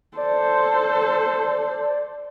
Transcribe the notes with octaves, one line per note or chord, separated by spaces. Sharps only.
A4 C5 D5